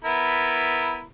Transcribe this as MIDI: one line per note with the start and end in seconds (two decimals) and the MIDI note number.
0.04 1.03 59
0.04 1.03 64
0.04 1.03 70